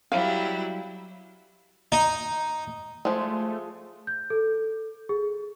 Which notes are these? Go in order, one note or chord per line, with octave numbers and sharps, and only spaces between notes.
F#3 G3 E4 F5
D#4
F3 G#3 A3
G6
A4
G#4